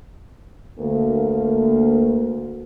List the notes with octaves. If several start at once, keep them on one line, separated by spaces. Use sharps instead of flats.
D2 A#3